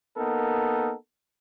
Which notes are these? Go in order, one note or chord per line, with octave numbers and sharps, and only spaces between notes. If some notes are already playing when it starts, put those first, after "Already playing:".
A#3 B3 D#4 A4 A#4